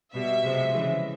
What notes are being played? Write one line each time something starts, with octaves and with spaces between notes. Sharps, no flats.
B2 G3 E5
C3 F3 G#3
C#3 E3 G#3